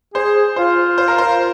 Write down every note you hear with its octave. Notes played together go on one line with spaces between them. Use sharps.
G#4 C5
F4 C5
C5
A#4
C5